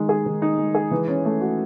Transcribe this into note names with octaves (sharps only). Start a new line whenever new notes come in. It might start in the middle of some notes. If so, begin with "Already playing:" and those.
Already playing: D#3 G#3 D#4
G#4
D#3
D#4
G#3
G#4
E3
C#4
A3
F#4